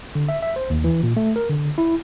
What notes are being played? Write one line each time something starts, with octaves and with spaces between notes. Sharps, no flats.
D3
E5
E5
C5
D#2
E3
A#2
A3
A#4
D3
E4